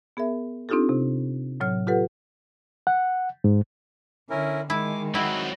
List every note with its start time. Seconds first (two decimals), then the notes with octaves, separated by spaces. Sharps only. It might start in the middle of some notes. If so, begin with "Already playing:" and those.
0.17 B3 G#4 A#4 E5
0.69 C4 D4 D#4 F4 G4 A4
0.89 C3
1.60 A2 F#3 C#5 F6
1.87 F4 G4 A4 B4 F#5
2.87 F#5
3.44 G#2
4.30 D3 C#4 E4 A#4
4.70 D#3 G#3 E4 G#5 D6
5.15 F#3 C4 D#4 E4 F#4